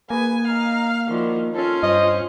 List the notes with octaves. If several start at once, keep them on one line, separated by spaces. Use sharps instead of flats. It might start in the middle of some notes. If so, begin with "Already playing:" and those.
A#3 G#4 B4 G#5
D#4 F5 A#5
D#3 F3 E4 F#4 D5
C#4 F4 A4 A5
G2 C5 D#5